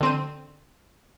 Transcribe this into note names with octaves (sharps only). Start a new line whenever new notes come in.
D3 C4 D#7